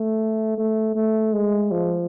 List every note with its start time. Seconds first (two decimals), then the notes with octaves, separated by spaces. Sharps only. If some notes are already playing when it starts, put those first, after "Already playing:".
Already playing: A3
0.58 A3
0.95 A3
1.33 G#3
1.71 F3